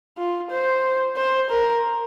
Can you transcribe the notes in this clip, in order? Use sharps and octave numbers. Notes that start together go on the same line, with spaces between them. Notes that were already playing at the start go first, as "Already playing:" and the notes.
F4
C5
C5
A#4